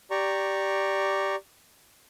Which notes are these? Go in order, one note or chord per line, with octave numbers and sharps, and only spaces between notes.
G4 D5 A#5 C#6